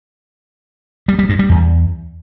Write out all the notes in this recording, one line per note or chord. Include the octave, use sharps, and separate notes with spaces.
G3
G3
G2
G3
E2